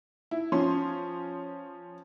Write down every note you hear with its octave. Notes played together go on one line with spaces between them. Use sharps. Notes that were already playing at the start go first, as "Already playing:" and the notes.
E4
F3 C#4 C6